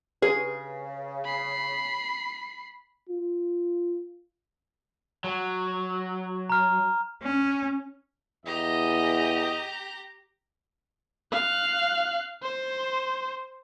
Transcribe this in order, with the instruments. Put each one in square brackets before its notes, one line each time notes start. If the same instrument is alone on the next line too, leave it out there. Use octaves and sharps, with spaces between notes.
[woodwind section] C#3 [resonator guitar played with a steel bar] G#4 [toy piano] B4
[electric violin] B5 C7
[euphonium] F4
[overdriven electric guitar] F#3
[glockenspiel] A#5 F6
[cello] C#4
[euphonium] E2 [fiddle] G4 A#5 [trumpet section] D#5
[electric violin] F5 F#6
C5